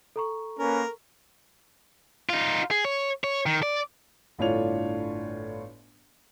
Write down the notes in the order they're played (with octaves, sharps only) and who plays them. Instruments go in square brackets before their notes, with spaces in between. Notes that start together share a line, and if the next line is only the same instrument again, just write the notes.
[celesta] A4 A#5 C#6
[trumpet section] A#3 C#4 B4 [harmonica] A#4
[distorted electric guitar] D#4 F4
G#4
C#5
C#5
D#3
D5
[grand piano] G1 A2 D4 F4 C#5 F7